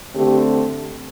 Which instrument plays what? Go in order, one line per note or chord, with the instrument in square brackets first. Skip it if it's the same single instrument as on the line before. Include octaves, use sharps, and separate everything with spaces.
[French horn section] D3 A3 C4 G4